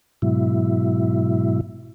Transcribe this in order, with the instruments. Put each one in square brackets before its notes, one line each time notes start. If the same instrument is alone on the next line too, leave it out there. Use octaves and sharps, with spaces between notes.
[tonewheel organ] G#2 B2 F#3 E4